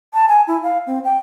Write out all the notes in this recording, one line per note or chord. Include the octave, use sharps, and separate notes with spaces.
A5
G#5
E4
F5
C4
G5